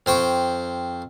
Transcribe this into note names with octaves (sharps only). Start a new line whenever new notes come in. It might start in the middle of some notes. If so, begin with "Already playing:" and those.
F2 C5 G5 C#6